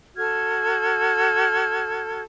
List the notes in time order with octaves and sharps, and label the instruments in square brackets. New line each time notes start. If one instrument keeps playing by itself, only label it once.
[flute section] F#4 A4 F6 G#6